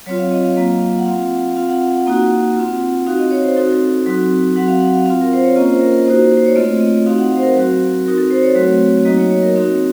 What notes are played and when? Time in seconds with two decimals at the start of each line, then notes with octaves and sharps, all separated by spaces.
0.06 F#3 C4 F4 C#5
0.19 F5
0.32 D#5
0.44 F5
0.56 F#3 A#3 F4
0.98 F#5
1.06 C4 F4 F5
1.57 C4 F4 F5
1.69 F#5
1.81 F5
1.94 F#5
2.06 A#3 D#4 F#4
2.57 C4 F4
3.06 C4 D#4 F#4 F5
3.19 D#5
3.31 C#5
3.44 C5
3.56 C4 D#4 F#4 A4
4.06 F#3 C4 D#4 F#4
4.56 F#3 C4 F#4 F#5
4.68 F5
4.81 F#5
4.94 F5
5.05 C4 F4 F5
5.21 A#4
5.33 C5
5.44 C#5
5.56 A#3 C#4 F4 D#5
5.68 C5
5.81 A#4
5.93 A#4
6.06 A#3 D#4 F#4 C5
6.37 C5
6.46 C#5
6.56 A3 C4 F4 D#5
6.80 D#5
7.06 C4 D#4 F#4 F5
7.18 F#5
7.31 F5
7.37 C5
7.43 A#4
7.55 F#3 C4 F#4
8.06 C4 D#4 F#4 A#4
8.18 A4
8.31 C5
8.43 C#5
8.55 F#3 A3 C4 F#4
9.05 F#3 A#3 D#4 F#4 D#5
9.18 C#5
9.30 C#5
9.43 A#4
9.56 C4 D#4 F#4